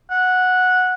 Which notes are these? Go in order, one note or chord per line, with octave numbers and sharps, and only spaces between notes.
F#5